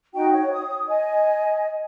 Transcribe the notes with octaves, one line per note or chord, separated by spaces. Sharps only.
D#4 F#4 G5
C#5
D#6
D#5 G#5